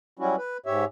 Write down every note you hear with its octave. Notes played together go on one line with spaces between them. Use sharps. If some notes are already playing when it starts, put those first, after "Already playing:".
F#3 G3 C#4 E4 F#4
B4
G#2 G4 C#5 E5